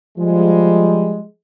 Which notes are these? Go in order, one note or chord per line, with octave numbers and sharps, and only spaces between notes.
F3 G3 G#3